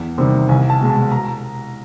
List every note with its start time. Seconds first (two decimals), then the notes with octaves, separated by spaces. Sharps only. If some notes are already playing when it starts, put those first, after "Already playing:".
Already playing: E2
0.18 C3 D#3 G3
0.49 C2 G#5
0.70 A5
0.80 B2 G#3
0.90 A5
1.11 A#5